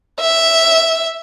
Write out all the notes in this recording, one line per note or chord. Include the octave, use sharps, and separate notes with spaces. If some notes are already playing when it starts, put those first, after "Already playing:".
E5